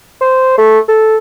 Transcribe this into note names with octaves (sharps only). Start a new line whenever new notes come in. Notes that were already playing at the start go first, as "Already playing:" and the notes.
C5
A3
A4